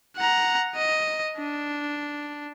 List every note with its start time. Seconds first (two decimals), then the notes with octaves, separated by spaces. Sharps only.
0.17 F#5 A#5
0.76 D#5
1.38 D4